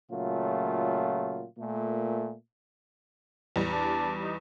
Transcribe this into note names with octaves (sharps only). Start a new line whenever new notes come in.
A#2 C#3 F#3 A3 F4
A#2 A3
E2 G3
D4
D#4